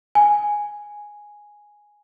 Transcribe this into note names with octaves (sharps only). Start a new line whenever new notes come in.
G#5